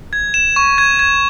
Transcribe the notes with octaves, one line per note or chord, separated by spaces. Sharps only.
G#6
E7
C#6
G#6
G#6